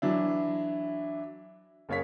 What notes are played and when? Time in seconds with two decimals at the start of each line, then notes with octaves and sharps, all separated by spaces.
0.02 E3 F#3 D4 E4
1.89 F#1 A#3 C#5 F5 B6